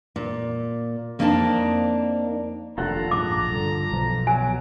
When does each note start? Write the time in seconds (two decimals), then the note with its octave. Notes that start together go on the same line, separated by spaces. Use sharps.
0.16 A#2
1.19 F2 A#3 C4 D4 D#4 A5
2.78 F1 D#2 D4 F4 A4 F#5 A#5
3.11 A#1 G#2 G#3 D6
3.51 G2 D3
3.92 B1 B2 F3
4.27 F#3 G#5